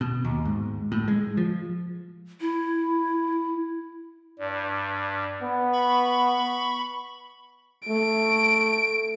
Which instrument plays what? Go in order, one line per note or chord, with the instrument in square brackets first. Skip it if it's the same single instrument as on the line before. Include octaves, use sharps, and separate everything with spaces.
[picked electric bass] B2
D#2
G#2
A2
G#3
F3
[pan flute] E4
[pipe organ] G2 [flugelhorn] D5
[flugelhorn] B3
[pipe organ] B5 C#6
[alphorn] A3 [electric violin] D7